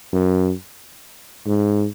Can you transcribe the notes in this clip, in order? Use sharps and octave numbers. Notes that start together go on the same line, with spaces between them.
F#2
G#2